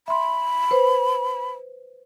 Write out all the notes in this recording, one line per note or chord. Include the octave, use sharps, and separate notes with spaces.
E5 B5 C6
B4 C5